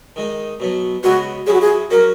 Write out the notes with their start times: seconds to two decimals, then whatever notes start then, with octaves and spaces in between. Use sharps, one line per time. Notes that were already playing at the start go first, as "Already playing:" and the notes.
0.16 D#3 G#3 D#4
0.60 B2 F#3 B3
1.04 C#3 G#3 B3 F#4
1.47 F#3 C#4 E4 G#4
1.54 F#4
1.61 G#4
1.91 F#3 C#4 F#4 A#4